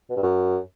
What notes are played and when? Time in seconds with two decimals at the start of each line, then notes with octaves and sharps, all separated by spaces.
0.10 B2
0.16 G2
0.23 F#2